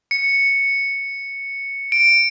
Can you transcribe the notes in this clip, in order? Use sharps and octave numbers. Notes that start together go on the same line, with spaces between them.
C#7
D7